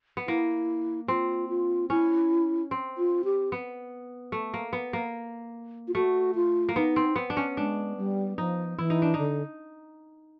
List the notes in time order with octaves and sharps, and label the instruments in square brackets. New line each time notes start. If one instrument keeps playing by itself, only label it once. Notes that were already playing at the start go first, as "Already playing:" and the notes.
[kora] B3
[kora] A#3 [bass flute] E4
[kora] C4 [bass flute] F4
[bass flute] F4
[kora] C#4 [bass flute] E4
[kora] C4
[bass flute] F4
G4
[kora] B3
A3
A#3
B3
A#3
[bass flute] F4
[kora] A3 [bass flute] F#4
[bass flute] F4
[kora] A#3
[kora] B3 [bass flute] D#4
[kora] C4
B3
D4
C#4
[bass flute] G#3 [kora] D4
[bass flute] G3
[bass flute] F3 [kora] D#4
[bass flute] E3 [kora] E4
[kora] D#4
D4
[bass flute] D3 [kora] D#4